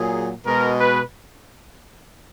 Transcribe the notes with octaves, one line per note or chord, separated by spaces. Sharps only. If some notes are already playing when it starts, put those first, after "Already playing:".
Already playing: A#2 F#3 G#4
B2 G#3 A#4
B4